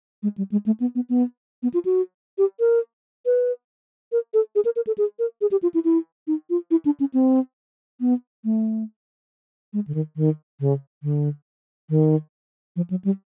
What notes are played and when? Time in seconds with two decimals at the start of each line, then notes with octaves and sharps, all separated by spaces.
0.23 G#3
0.38 G3
0.52 G#3
0.66 A3
0.80 B3
0.95 B3
1.09 B3
1.63 B3
1.74 F4
1.85 F#4
2.38 G4
2.60 A#4
3.26 B4
4.12 A#4
4.34 A4
4.55 G#4
4.65 A#4
4.76 A#4
4.87 A4
4.98 G#4
5.19 A#4
5.41 G#4
5.51 G4
5.63 F4
5.74 E4
5.85 E4
6.27 D#4
6.50 F4
6.71 E4
6.85 D4
7.00 C#4
7.14 C4
8.00 B3
8.44 A3
9.73 G#3
9.88 D3
9.95 D#3
10.16 D#3
10.60 C#3
11.03 D3
11.90 D#3
12.76 F3
12.90 F#3
13.05 G3